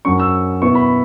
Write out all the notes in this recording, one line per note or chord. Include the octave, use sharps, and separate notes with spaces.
F#2 F#3 C#4 C#6
E6
B2 B3 E4 C#6
B5